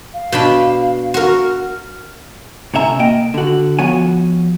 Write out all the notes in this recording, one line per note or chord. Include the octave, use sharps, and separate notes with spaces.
F5
B2 D4 B5
F#4 A#4
F6
A2 C3 C#4 E5 A#5
A#3 D#5 G5
D3 F#4
F3 B3 F#4 C#5 G#5